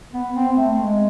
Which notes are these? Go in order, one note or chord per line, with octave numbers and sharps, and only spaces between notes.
B3
C4
A3
G#3